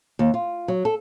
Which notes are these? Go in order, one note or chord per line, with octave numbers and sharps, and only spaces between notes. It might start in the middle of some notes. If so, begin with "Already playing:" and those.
D#2
F4
F#3
A4